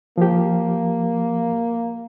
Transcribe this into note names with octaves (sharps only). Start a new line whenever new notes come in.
F3 A#3 G4